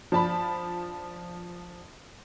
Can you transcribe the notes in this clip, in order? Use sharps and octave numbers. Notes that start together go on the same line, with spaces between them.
F3 D4 A5 B5